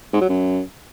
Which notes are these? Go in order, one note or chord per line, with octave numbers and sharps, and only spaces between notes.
G#2
F#3
F#2